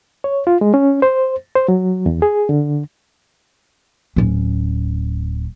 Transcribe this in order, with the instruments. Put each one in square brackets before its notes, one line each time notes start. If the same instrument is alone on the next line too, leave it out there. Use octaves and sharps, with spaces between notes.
[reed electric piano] C#5
F4
G#3
C#4
C5
C5
F#3
E2
G#4
D3
[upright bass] D1 C#4